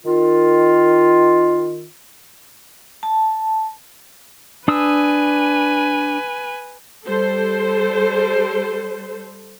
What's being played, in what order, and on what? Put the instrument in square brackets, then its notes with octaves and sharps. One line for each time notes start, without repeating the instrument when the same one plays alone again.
[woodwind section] D#3 F4
[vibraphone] A5
[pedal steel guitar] D4 D#6 E6 [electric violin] B4 G#5
[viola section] G3 A4 C5